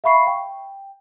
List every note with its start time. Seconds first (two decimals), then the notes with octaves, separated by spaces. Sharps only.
0.04 E5 F5 B5 C#6 C7
0.27 G5